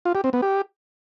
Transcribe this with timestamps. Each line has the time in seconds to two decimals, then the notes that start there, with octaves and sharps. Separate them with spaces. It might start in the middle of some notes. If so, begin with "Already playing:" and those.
0.05 F4
0.15 G4
0.24 C4
0.33 B3
0.42 G4